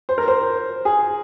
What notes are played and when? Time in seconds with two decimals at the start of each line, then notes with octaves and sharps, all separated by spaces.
0.09 C5
0.18 A#4
0.28 C5
0.85 G#4